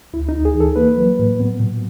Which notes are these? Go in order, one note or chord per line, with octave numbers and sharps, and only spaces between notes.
D2 E4
D#4
D2
G#4
E3
A4
A#3 B4
F#3
A2
B3
A#2